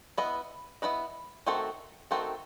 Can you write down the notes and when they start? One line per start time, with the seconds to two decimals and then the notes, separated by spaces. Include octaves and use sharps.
0.18 B3 E4 B4 D#5
0.82 B3 E4 B4 D#5
1.46 D#3 A3 C4 F#4 A4
2.11 D#3 A3 C4 F#4 A4